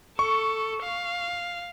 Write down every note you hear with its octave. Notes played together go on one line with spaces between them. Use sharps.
A4 C#6
F5